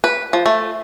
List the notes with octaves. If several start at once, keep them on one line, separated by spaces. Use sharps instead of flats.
B4
F3
A3